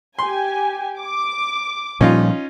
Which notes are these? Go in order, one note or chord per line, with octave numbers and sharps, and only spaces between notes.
G4 G#5 C6
D6
A#2 F3 G3 C#4 D#4 F4